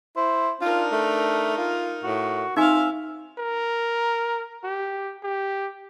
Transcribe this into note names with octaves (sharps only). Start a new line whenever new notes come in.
E4 C5
D4 D#4 F4 A#4
A3
F4
A2 F#4
C4 D#4 F4 E5 F5 G#5
A#4
G4
G4